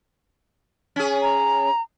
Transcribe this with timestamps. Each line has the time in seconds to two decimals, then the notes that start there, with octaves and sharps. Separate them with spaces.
0.96 C#4 G#4
1.22 A#5